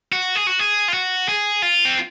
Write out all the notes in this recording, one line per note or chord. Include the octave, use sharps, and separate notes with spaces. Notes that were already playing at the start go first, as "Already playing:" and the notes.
F#4
G#4
F#4
G#4
F4
F#4
G#4
F4
C4